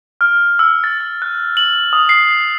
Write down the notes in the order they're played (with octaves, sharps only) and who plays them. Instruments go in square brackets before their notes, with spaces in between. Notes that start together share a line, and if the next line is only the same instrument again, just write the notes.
[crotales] F6
E6
A6
E6
F#6
F#7
D#6
C7